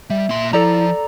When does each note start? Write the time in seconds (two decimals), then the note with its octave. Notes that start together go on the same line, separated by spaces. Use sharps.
0.10 G3 E5
0.29 A#2 C6
0.53 F3 E4 A4 D5 A#5